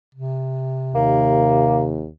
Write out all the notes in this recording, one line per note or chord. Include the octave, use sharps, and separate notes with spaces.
C3
D#2 A#3